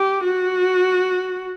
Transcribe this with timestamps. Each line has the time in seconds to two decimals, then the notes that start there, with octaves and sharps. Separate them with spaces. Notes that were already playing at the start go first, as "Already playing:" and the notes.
Already playing: G4
0.24 F#4